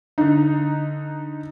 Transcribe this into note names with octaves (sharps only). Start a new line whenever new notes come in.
D3 D#4